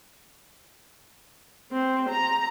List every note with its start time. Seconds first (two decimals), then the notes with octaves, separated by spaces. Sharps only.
1.72 C4
2.10 A#5